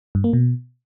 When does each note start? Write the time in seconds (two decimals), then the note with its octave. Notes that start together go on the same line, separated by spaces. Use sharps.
0.15 G2
0.24 A#3
0.33 B2